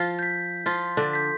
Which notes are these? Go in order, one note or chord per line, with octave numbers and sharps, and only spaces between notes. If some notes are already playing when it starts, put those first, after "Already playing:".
Already playing: F3 F4
G6 B6
F3 F4 C6
D3 D4
G6 B6